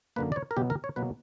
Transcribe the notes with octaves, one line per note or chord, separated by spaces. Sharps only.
F#2 D3 A#3 B4
D5
C#5
A#4
B2 F#3 B3 G4
A#4
C#5
B2 F#3 A#3 B4